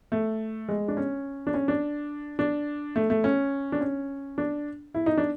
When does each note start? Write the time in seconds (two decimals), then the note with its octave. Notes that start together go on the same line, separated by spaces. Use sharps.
0.12 A3
0.69 G#3
0.88 D4
0.97 C#4
1.47 D4
1.54 C#4
1.68 D4
2.39 D4
2.96 A3
3.10 A3
3.24 C#4
3.72 D4
3.81 C#4
4.38 D4
4.94 E4
5.06 D#4
5.17 D4